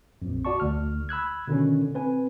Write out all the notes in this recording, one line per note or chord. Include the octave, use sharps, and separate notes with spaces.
A#1 F2
F#4 D5 A5 C#6
D2 F6
B5 E6 F#6 G#6
B2 D3 D#3 C#4
C4 B4 G#5